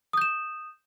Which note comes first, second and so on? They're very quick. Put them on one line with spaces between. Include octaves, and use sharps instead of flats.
D#6 G6 E7